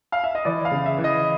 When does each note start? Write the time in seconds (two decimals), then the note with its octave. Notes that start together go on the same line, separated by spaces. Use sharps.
0.12 F5
0.24 E5
0.35 D#5
0.45 E3 D5
0.65 F5
0.71 C#3
0.86 E5
0.98 E3
1.04 D#5